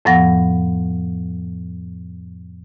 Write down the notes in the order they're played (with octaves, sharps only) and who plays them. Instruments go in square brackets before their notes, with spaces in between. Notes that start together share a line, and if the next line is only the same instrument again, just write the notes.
[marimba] F2 A2 F3 B3 F#5 A#6